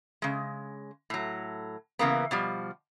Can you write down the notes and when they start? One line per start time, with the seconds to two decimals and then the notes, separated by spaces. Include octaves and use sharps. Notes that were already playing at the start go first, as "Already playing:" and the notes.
0.22 C#3 G#3
1.10 A2 F#3
1.99 C#3 E3 A#3 B3
2.31 B2 F3 G3